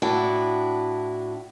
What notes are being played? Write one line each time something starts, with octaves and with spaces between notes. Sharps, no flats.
A2 D4 E4 F#4 G5